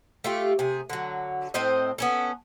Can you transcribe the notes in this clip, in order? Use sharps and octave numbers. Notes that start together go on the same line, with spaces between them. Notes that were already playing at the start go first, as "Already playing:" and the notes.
A3 F4 G4
C3 G#4
D3 F#3
A2 C4 C5 D#5
B3 C#4 A4